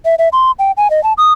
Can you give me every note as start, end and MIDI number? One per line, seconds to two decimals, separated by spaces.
0.05 0.15 76
0.19 0.29 76
0.33 0.51 84
0.59 0.72 79
0.77 0.90 80
0.90 1.03 75
1.04 1.13 81
1.18 1.33 87